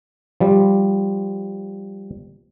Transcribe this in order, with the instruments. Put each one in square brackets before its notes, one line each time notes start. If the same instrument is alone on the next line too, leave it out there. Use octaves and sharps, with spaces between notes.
[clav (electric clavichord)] F3 G3